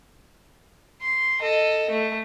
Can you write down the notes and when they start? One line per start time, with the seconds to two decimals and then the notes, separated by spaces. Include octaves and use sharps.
1.02 C6
1.41 A4 D#5
1.90 A3